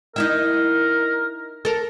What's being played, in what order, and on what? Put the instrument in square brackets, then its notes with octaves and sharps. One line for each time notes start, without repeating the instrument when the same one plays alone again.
[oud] D#4 E4 E5 [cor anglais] A#4
[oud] A4 A#4